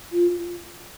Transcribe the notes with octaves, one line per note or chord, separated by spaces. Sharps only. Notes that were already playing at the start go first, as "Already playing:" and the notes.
F4